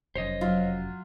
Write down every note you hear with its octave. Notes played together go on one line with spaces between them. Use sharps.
F1 F#2 C5 C#5 D#5
F#3 F4